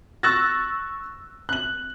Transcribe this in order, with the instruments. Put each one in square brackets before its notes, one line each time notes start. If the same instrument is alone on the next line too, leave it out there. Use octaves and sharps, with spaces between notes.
[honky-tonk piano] C#6 E6 F#6 A6 A#6
F#6 F#7